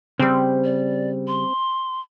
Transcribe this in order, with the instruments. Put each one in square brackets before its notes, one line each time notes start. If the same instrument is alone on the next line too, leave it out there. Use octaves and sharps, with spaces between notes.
[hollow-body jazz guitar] C#3 G3 [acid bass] C4
[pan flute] D5
C6